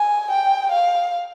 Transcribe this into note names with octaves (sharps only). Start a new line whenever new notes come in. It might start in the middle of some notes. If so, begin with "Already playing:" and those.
Already playing: G#5
G5
F5